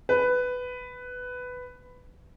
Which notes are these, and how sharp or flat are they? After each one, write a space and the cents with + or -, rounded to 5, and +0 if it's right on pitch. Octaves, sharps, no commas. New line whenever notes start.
B4 +10